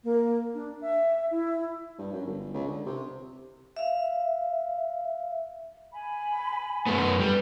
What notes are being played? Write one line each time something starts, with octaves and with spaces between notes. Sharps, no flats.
A#3
D4
E5
E4
G2
F#2
G1
C#2
D3
C3
E5 F5
G#5 B5
F#2 A3 B3
G3 B4